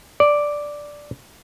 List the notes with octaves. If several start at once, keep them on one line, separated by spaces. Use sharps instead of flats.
D5